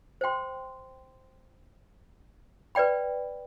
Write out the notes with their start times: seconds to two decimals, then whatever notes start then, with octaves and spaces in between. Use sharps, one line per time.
0.21 C5 G5 C6
2.75 B4 D5 G5 B5